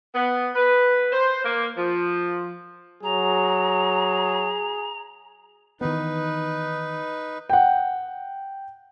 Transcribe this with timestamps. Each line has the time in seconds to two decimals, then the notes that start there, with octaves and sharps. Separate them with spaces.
0.15 B3
0.55 B4
1.13 C5
1.44 A#3
1.77 F3
3.03 F#3 G#4 A#5
5.81 D#3 E3 B3 D#4 B4
7.49 F#5 G5